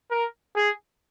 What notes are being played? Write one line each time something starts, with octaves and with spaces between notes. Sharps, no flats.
A#4
G#4